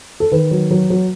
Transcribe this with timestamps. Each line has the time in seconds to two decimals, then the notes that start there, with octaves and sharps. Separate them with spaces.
0.20 A4
0.32 D#3 B4
0.51 F#3
0.71 F#3
0.90 F#3